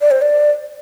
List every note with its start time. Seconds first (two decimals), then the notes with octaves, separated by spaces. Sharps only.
0.01 D5
0.11 C5
0.22 D5